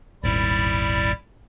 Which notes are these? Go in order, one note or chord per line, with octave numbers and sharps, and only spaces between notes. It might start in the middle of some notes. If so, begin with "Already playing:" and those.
D#1 G#1 G3 E4 D5